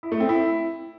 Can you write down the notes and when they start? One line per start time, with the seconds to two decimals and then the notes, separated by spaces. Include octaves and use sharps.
0.03 E4
0.12 A3
0.20 C4
0.29 E4